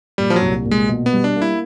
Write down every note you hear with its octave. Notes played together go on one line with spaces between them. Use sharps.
A#2 G3
F3
F#3
C2
A#2
G#3
B2
B3
G3
D4
A#3
E4